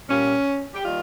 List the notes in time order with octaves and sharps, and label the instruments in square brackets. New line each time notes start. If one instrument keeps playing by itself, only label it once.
[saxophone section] A#2 G3 A#3 C#4
G4
D#3 G3 A#3 F4